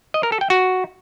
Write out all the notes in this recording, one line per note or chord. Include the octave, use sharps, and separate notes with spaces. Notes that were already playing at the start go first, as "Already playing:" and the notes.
D#5
A#4
A4
G5
F#4